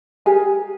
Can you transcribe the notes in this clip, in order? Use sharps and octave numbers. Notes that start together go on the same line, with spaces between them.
G4 G#4 A#4 G#5